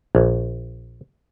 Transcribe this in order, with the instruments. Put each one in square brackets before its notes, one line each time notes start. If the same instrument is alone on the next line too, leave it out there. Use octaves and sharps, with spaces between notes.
[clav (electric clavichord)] A#1